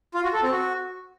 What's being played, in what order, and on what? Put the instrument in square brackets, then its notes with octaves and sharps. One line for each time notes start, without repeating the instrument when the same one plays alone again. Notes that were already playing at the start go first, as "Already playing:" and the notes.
[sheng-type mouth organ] F4
F#4
A4
C4
F#4